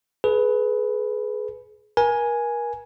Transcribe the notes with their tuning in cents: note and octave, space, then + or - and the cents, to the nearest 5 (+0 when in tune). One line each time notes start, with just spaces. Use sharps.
G#4 +35 B4 +0
A#4 +35 G#5 +0